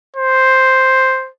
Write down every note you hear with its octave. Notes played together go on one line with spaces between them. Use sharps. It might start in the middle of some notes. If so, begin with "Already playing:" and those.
C5